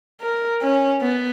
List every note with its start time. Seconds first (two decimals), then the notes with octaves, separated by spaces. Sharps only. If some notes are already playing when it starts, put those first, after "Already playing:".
0.21 A#4
0.62 C#4
1.01 B3